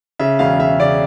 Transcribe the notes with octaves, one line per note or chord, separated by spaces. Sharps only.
C#3 E5
E1 F5
E1 E5
C#3 D5